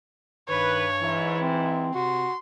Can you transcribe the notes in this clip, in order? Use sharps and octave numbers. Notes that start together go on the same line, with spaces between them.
G2 D#3 B4 C#5
G#2 E3 E4
C4
C3 F#4 C6